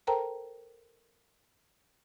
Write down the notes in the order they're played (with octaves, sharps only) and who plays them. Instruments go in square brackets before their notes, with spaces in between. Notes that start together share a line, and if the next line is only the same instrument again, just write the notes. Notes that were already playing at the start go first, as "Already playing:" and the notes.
[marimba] A4 A#4 C5 G5 A5 A#5